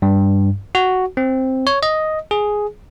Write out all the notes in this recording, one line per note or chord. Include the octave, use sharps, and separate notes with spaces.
G2
F#4
C4
C#5
D#5
G#4